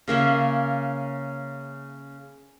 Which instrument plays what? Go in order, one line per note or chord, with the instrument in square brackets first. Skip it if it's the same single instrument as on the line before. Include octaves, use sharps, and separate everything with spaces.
[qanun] C#3 A#3 C#4 E5